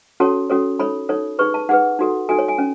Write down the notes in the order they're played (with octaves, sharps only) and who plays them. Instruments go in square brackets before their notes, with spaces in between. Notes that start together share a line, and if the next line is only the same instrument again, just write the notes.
[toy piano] C#4 F#4 A4 C#5 A5
C#4 F#4 A4 C#5
D#4 A4 C#5 B5
D#4 A4 C#5
D#4 G#4 B4 C#6
A5
D#4 G#4 B4 F#5
D#4 F#4 A4
D#4 F#4 A4 G#5
C#5
G#5
C#4